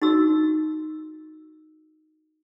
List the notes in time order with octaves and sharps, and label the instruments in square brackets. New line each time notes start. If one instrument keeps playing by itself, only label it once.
[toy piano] D#4 F#4 E6